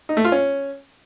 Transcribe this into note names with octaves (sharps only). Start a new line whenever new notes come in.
D#4
A3
F4
C#4